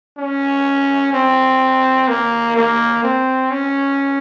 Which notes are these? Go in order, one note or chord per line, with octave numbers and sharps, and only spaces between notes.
C#4
C4
A#3
A#3
C4
C#4